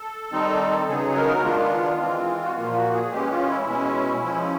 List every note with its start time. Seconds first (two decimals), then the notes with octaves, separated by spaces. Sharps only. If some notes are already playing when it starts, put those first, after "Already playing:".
Already playing: A4
0.32 D#3 G3 C4 D#4
0.88 C#3 F#3 B3 D#4 G#4
1.16 A#4
1.44 D#3 G#3 B3 D4 F4
2.00 E3 G#3 C4
2.45 F#4
2.56 A#2 F3 A#3 F4
2.75 F#4
2.93 G#4
3.12 E3 G#3 C#4 G4
3.31 F4
3.49 E4
3.67 B2 G#3 C#4
4.24 F3 G#3 C#4